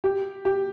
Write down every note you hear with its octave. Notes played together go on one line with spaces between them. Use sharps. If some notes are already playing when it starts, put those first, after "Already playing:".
G4
G4